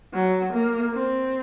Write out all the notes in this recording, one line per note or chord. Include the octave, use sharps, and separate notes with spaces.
F#3
A#3
C4